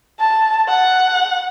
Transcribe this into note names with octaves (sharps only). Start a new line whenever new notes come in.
A5
F#5